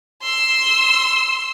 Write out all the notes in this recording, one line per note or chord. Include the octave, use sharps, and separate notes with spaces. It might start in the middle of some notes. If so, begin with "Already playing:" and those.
C6 E6